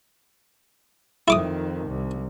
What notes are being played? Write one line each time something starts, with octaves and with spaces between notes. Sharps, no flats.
F2 D#3 E4 D6 D#6
C2